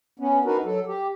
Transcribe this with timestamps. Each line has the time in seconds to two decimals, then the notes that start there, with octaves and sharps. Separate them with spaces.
0.19 B3 C#4
0.45 D4 D#4 F#4 A#4 B4
0.65 F#3 A4
0.87 G4